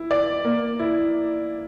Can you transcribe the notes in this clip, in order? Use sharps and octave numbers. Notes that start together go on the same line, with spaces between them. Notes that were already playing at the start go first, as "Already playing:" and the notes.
Already playing: E4
D5
A#3
E4